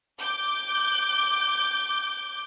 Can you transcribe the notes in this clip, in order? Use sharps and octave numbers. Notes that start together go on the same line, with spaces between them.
D6 G6